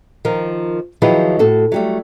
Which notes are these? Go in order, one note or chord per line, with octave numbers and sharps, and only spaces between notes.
D#3 F3 A#4
D#3 F3 F#3 E4 G#4 B4
A2 F#4 A4
F#3 G3 A3